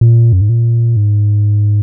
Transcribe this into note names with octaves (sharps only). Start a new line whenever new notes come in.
A#2
F#2
G#2
A#2
G#2